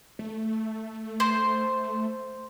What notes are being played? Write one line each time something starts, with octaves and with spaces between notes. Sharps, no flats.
A3
C5